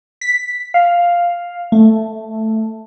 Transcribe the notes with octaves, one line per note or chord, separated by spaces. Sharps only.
B6
F5
A3